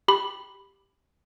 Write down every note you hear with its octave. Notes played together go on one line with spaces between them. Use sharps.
G4 B5